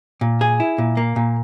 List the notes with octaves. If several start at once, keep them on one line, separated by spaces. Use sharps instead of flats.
A#2
G#4
E4
A#2
A#3
A#2